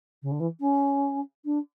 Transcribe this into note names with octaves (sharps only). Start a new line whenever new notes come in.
C#3
D3
E3
C#4
D4